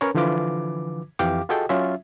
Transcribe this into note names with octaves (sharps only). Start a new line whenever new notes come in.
C#4 A#4 B4 C#5
D3 E3 F3 F4 B4 D6
F2 E3 G4 F5 G5 D6
F4 F#4 G#4 A4 D#5 G5
F#3 C#4 F4 E5